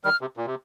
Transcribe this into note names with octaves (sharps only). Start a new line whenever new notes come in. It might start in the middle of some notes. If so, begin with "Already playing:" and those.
D#3 G3 F6
C3
A#2
C3